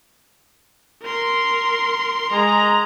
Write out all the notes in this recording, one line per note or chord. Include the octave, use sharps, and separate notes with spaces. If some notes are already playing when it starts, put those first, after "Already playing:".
A#4 C6
G#3 A#5